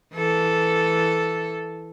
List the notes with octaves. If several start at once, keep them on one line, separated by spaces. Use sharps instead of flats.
E3 A4